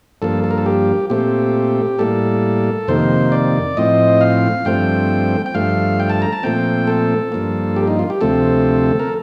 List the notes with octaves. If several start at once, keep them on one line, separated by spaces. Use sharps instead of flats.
G2 F3 A#3 A4
A4
A#4
A4
G4
A#2 A3 C4 G4
A2 G3 A#3 A4
F2 C3 D#3 A#3 C5
D5
A2 F3 C4 D#5
F5
G2 F3 A3 C4 G5
G5
G2 F3 A3 F5
G5
A5
A#5
A5
A#2 F3 A3 C4 G5
A4
G2 F3 A#3
G4
D#4
F4
G4
D2 C3 F3 A3 C4 A4
A#4